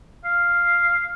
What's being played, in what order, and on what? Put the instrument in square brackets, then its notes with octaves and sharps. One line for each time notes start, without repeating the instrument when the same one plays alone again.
[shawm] F5